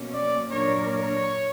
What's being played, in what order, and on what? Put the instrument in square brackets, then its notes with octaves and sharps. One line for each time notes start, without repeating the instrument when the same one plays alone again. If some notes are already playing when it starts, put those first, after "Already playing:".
Already playing: [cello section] B2 F#3 A#3 C#4
[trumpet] D5
[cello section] A#2 F#3 A#3 D4 A#4 [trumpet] C#5
[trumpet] C#5